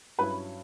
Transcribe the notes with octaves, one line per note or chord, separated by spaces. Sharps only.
G2 F#3 C#4 E4 B4